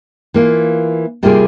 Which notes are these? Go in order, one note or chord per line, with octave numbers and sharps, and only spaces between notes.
E3 A#3 F4
C3 G3 A#3 F4 G#4